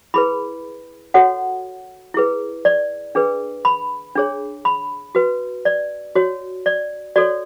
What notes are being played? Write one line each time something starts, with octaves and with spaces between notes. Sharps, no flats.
E4 G#4 B4 B5
F#4 A4 C#5 F#5
E4 G#4 B4
D5
D4 G#4 B4
B5
D4 G#4 C#5
B5
F#4 B4
D5
F#4 C#5
D5
F#4 A4 C#5 D5